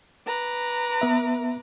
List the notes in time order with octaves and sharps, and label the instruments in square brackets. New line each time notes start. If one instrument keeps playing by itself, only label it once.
[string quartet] B4 A#5 D6
[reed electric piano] B3 E5